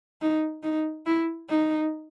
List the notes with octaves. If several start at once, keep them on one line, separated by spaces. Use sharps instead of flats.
D#4
D#4
E4
D#4